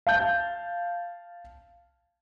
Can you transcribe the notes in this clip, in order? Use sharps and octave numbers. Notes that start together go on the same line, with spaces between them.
F5 A5 G6